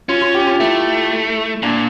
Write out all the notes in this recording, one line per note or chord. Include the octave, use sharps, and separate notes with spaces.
C#4 F4
F4
G4
F4
A3 E4
A#2 D4